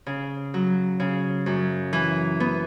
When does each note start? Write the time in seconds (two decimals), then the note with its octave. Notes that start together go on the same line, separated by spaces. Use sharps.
0.06 C#3
0.54 F#3
1.00 C#3
1.46 F#2
1.93 E3
2.40 B3